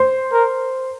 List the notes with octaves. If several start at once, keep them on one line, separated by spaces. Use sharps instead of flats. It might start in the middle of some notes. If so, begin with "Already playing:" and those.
Already playing: C5
A#4